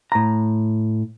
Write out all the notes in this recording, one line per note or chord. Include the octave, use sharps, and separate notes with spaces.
A2 A#5